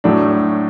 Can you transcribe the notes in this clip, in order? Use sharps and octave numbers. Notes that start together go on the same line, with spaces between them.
A2 F#3 A3 D4